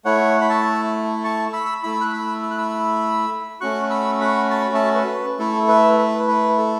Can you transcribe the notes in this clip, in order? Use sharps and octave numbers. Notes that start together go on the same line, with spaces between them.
A3 E4 C#5 F#5
B5
E5 A5
A5 C#6
B5 E6
A3 E4 B5 E6
F#6
B5 E6
E6
F#6
B5 E6
A3 C#4 F#4 C#6 F#6
B5 E6
F#5 B5
A5
B5
E5 A5
B4
A3 E4 A4
B4 E5
B4
B4
A4